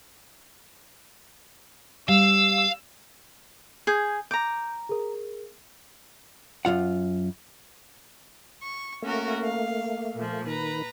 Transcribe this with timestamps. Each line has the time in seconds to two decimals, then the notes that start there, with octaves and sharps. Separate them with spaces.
2.08 G3 F5 E6
3.87 G#4 D#6 G6 G#6
4.31 A#5 D6 G6
4.89 G#4 A#4
6.65 F#2 D#3 F4 F#5
8.62 C#6
9.02 A3 A#3 C#4 F#4 A#4
9.43 F5
10.15 A#2 F3
10.46 D#3 B4 A#5